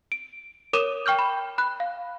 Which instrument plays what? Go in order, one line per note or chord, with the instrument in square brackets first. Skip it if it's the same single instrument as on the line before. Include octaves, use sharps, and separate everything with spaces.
[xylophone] D7
A#4 C#5 D6 D#6 D#7 E7
G5 C#6 F6 G6
B5
B5 F#6
F5